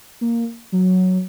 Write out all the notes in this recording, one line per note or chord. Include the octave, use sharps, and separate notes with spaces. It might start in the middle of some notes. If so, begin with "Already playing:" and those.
A#3
F#3